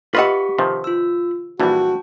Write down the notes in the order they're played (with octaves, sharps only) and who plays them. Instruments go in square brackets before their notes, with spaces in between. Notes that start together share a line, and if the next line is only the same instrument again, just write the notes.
[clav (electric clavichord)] F4 E5 [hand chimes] G4 C#6 B6 [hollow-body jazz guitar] B4 D#5 F#5
[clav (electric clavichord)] C3 D#3 F3
[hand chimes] F4 E6
[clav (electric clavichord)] A#1 E3 G3 [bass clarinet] F#4 [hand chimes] G5 A5